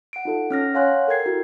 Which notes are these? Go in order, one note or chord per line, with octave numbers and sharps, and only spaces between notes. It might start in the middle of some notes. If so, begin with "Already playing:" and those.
F#5 D7
D#4 F4 A4 F#5
C#4 F6 A#6
C#5 F5 F#5 G#5 C6 F#6
A4 A#4 G5 G#6 C7
E4 F#4